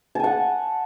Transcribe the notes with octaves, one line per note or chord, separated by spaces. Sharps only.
F#5 G#5 A5